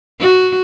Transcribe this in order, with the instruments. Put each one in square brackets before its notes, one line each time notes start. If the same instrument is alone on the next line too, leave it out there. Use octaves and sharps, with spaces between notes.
[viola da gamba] F#4